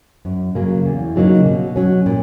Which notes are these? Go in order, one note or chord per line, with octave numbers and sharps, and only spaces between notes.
F#2
C#3 F#3 A#3
E2
C#3 F#3 A#3 D#4
B2
F#3 C#4
A#2